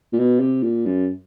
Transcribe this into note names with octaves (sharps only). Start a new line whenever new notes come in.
A#2
B2
C3
A#2
F#2